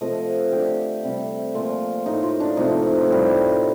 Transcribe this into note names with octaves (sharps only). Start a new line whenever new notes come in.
C3 F3 A3 D#5
D#5
D3 A3 G4
C3 G3
A#2 F3 A3 F4
A2 A3 D#4
F4
D4
C3 F3 A3 D#4
F4
D#4
D#4
A2 G3